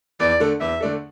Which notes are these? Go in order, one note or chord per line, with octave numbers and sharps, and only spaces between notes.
E2 D5
D3 A3 D4 A4
E2 E5
D3 A3 D4 A4